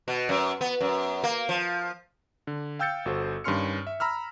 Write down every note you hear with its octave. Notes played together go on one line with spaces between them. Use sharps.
B2
F#2
B3
F#2
A#3
F3
D3
F5 G5 E6 G6 A6 C#7
G1 F#4 A4 C5
G2 D#3 C#4 C6 F6 C#7
E5
A#5 B5 E6 F6